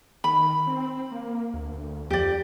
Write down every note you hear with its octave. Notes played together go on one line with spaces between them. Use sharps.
D#3 B5
C4
A#3
D2
F2 G4 D5